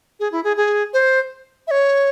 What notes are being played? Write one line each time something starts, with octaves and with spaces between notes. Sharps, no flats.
G#4
E4
G#4
G#4
C5
E5
C#5